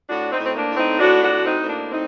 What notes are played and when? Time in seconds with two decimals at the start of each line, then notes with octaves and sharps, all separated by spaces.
0.08 A2 D4 F#4
0.31 C4 D#4
0.39 A2
0.45 C4
0.54 A#3 D4
0.69 A2
0.77 C4 D#4
0.99 A2 D4 F#4
1.23 D4 F#4
1.30 A2
1.45 C4 D#4
1.60 A2 C4
1.68 A#3 D4
1.90 A2 C4 D#4